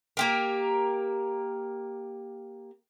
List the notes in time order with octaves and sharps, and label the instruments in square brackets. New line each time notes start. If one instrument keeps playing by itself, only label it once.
[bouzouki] A#3 G4 A#4